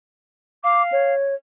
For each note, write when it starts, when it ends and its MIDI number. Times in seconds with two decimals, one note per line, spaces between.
0.64 1.14 77
0.64 0.82 86
0.92 1.35 73